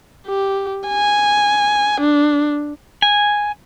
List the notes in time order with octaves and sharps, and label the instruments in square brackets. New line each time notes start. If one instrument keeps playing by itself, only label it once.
[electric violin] G4
G#5
D4
[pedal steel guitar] G#5